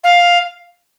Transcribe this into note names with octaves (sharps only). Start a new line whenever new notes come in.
F5